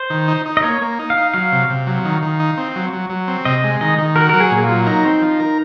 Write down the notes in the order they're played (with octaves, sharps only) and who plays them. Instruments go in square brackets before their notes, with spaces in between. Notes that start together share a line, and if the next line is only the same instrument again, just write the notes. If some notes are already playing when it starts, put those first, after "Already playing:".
Already playing: [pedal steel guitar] C5
[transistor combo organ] D#3
D#4
D#4
[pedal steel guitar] D#5
[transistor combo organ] A#3 [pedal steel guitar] C#5
[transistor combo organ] A#3
D#4
[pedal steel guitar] F5
[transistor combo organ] D#4
[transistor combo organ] F#3 [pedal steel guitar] F5
[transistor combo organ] C3
C3
F#3
D#3
D#3
D#4
C4
F#3
F#3
F#3
C4
[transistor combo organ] C3 [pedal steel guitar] D#5
[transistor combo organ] G#3
[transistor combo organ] D#3 [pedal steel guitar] D#5
[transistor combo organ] D#3
[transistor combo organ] F#4 [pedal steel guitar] A#4
[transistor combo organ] F#3 [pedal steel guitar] A#4
[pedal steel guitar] G#4
[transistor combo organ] A#2
[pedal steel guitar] F4
[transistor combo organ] F#3
[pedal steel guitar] D#4 [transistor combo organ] A#4
[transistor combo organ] C4
F3
A#4